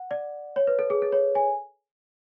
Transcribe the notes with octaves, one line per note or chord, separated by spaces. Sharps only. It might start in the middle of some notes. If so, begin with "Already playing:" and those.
Already playing: F#5
D5
C#5
B4
A4
G#4
A4
C#5
G#5